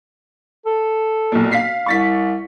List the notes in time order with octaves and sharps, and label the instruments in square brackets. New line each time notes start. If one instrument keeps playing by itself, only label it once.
[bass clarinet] A4
[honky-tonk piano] B1 A#2
F5 B6 C7
[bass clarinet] C2 [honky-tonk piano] C#6 A6 B6